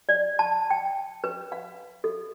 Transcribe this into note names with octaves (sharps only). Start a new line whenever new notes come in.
D5
A5
G5
B4
F5
A4